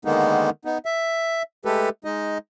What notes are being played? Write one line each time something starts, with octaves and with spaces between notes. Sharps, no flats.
D3 D#3 G#3 A#3 B3 D#4
B3 D#4
E5
G#3 A3 G4 A4 B4
G#3 D#4 D#5